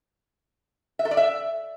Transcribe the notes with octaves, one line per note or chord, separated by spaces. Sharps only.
E5
A4
D5
E5